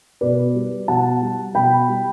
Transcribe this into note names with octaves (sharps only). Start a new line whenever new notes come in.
B2 B4 D5
G3
B2 F#5 A5
G3
B2 G5 B5
G3